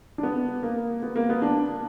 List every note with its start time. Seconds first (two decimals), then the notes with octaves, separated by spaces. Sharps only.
0.18 D4
0.23 B3
0.63 A#3
1.02 B3
1.16 A#3
1.29 B3
1.42 D4